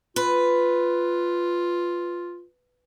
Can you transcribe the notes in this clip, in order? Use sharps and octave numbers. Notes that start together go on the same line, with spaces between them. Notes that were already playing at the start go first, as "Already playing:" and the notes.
F4 B4